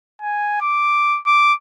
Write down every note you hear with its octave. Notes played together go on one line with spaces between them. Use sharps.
G#5
D6
D6